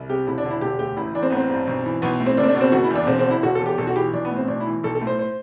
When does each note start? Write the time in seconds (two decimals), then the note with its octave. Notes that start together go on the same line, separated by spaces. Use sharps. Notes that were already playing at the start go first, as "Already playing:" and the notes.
Already playing: C2
0.10 C3 G4
0.27 E1 E4
0.38 D4
0.44 D3
0.50 E4
0.61 E1 G4
0.79 D2 G4
0.97 A1 E4
1.14 E3 D4
1.23 C4
1.30 A1 B3
1.37 C4
1.50 G2
1.67 B1
1.85 E3
2.02 B1 B3
2.20 A2
2.26 C4
2.37 F#1 D4
2.43 C4
2.49 D4
2.55 B2
2.61 C4
2.72 F#1 F#4
2.84 E4
2.90 E2
2.95 D4
3.07 E1 C4
3.19 C4
3.26 D3 E4
3.43 E1 F#4
3.55 E2 A4
3.66 G4
3.77 B1 A4
3.87 F#4
3.96 E3 G4
4.13 B1 D4
4.25 B3
4.31 A2
4.37 C4
4.48 B1 D4
4.60 E4
4.66 E3
4.83 B1 A4
4.95 A4
5.01 A2
5.07 C5
5.19 C5